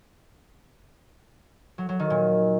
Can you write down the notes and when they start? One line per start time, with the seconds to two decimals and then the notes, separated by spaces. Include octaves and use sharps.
1.78 F#3
1.89 F#3
2.00 D#3
2.10 A#2